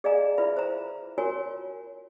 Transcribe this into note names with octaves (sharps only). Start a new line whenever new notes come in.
G#4 D5 D#5 F5 G#5 A#5
E4 F4 B4 E5 B5
C5 A#5
F4 F#4 A#4 C#5 G#5